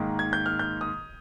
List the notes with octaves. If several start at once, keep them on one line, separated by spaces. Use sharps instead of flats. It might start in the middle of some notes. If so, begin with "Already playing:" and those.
Already playing: G#2 D#3 A#3
G#6
G6
F6
G6
D#6